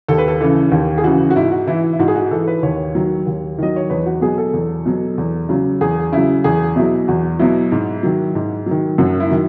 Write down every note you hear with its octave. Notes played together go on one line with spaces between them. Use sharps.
D#2 A4
B4
A4
C#3 E3
D#2
G#4
C#3 E3 F#4
F#4
G#2 E4
F#4
E3 E4
E4
G#2 F#4
G#4
F#4
E3 A4
B4
D#2 C#5
D#3 F#3
D#2
D#3 F#3 D#5
C#5
E2 B4
F#4
B2 F#3 G#4
A4
E2
B2 F#3
E2
C#3 F#3
E2 G#4
C#3 F#3 E4
E2 G#4
B2 F#3 E4
E2 F#4
B2 F#3 E4
G#2
D#3 F#3
G#2
D#3 F#3
F#2 F#4
E4
D#3 F#3